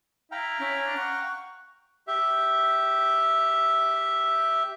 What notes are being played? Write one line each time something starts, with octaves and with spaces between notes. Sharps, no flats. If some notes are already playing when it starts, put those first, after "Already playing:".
E4 F5 G5 A#5
C#4 E4
D4
F#5 C#6
G4 E5